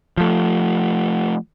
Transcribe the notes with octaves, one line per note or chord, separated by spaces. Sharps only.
F3 A3